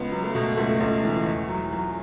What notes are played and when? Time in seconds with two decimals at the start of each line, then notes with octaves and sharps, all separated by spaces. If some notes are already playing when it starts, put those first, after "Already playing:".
Already playing: C#2 B3
0.12 F#3
0.23 A3
0.35 B2
0.57 C#2 A3
0.80 C#2
1.03 E3
1.26 E2
1.49 F#3
1.73 F#3